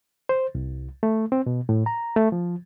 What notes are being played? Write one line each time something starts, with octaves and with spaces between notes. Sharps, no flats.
C5
C2
A3
C4
B2
A2
A#5
A3
F3